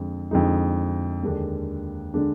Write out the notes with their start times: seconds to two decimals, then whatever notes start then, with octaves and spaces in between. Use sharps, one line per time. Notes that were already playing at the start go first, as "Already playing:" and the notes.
Already playing: F2 D3 G#3
0.31 F2 D3 G#3 D#4
1.23 D#2 D3 G#3 D4
2.14 D3 G#3 D4